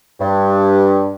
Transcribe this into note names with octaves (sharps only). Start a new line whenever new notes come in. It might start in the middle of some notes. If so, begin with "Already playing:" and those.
G2